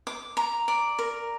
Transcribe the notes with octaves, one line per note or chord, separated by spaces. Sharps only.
D6
A#5
D5
A#4